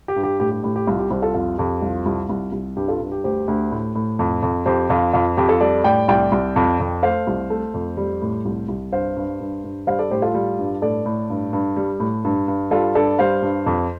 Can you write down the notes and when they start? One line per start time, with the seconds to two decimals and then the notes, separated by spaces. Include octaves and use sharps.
0.08 G4
0.16 G2
0.23 G4
0.40 A2 G4
0.51 G4
0.63 A2 G4
0.76 G4
0.87 C2 F4
0.99 G4
1.11 C2 G4 C5
1.22 F4 A4
1.34 F2 F4
1.58 F2 G4
1.82 C2 F4
2.06 C2
2.29 C2
2.52 C2
2.76 G2 G4
2.88 F4 A4
3.00 G2
3.12 G4
3.24 D2 G4 C5
3.48 D2
3.71 A2
3.95 A2
4.19 F2
4.42 F2
4.66 F2 G4 C5
4.90 F2 F4
5.13 F2 F4
5.37 F2 G4
5.49 F4 A4
5.61 G3 A4 D5
5.84 A2 D5 G5
6.08 C2 D5 G5
6.32 C2
6.56 F2
6.80 F2
7.03 A3 C5 F5
7.27 C2
7.50 A3
7.74 F2
7.97 G3
8.22 A2
8.45 C2
8.68 C2
8.92 G2 C5 F5
9.16 G2
9.40 G2
9.64 G2
9.87 G3 C5 F5
9.99 A4 D5
10.11 A2 G4 C5
10.22 F4 A4
10.34 G3
10.59 G2
10.82 A2 A4 D5
11.06 A2
11.30 G2
11.53 G2
11.76 G3
12.00 A2
12.25 G2
12.48 G2
12.71 G3 F4 A4
12.95 G2 A4 D5
13.19 G3 C5 F5
13.42 G2
13.66 F2